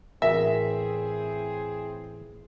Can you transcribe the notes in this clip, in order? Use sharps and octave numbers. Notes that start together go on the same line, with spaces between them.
A1 C4 E4 G#4 A#4 E5